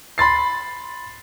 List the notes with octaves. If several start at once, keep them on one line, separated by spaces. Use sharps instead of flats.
B5 C6 A6 C7